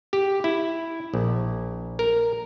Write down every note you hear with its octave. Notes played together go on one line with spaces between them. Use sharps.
G4
E4
A#1
A#4